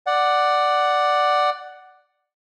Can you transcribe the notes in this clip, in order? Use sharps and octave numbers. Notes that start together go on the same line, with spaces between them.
D5 F#5